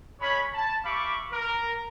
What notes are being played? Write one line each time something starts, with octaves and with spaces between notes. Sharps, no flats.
G#3 C#4 C#5 B5
A5
G4 E5 F5 B5 C#6 D6
A#4